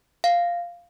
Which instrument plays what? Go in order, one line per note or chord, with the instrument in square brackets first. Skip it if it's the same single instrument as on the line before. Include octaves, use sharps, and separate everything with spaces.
[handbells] F5